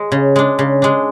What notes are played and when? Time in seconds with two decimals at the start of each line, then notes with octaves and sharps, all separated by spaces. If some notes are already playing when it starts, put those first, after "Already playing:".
Already playing: G#3
0.12 C#3
0.36 G#3 D4
0.59 C#3
0.82 G#3 D4